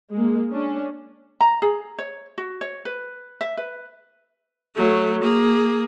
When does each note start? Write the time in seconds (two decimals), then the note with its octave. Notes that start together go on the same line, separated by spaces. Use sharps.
0.13 G#3 A#3
0.52 C#4 D4
1.41 A#5
1.62 G#4
1.99 C#5
2.38 F#4
2.61 C#5
2.85 B4
3.41 E5
3.57 B4
4.75 F#3 A3
5.22 A#3 G#4